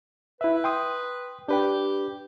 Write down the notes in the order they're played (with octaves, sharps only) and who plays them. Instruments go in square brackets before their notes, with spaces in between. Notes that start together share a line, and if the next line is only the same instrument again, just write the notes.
[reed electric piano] E4 E5 [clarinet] B4
[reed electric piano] G5 C6 D#6
[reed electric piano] D4 B4 G5 [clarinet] G4